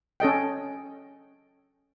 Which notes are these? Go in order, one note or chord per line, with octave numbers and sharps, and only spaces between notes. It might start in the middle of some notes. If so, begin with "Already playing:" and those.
C#4 A4 D#5 G5